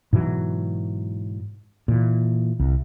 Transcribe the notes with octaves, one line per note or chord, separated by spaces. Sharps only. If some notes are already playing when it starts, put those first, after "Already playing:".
G#2 B2 E3 F#3
A#2 E3
C2